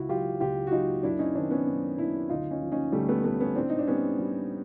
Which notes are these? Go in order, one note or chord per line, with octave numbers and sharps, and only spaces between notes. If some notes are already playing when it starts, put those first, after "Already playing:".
Already playing: C#2 E4 F#4
F#3 F4 G4
C#2 F4 G4
F#4
F#3 D#4 F4
F#2 D4 E4
C#4 D#4
D#3 C4 D4
B3 C#4
F#2
F#2 D4 E4
D2 D#4 F4
C#4 D#4
F3
C#4 D#4
D2 G3 A3
A3 B3
F3 A3 B3
B3 C#4
A2 C4 D4
D#4
D4
G3 B3 C#4
G3